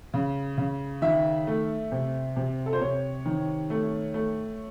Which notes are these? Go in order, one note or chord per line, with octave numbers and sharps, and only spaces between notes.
C#3
C#3
D#3 E5
A3
C3
C3
A4
C5
C3 C#5
D#3
A3
A3